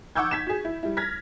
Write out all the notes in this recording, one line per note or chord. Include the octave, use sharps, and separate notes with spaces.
F#5 C#6 D6 E6 G6 G#6
G#6 B6 E7
F#4 G#4
E4
G3 E4
F6 G#6 A#6 B6